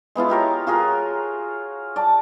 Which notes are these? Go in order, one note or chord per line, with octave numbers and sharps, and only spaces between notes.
G#3 B3 E4 F4
F4 G4 A#4 C#5
F4 F#4 G#4 A#4
D5 A5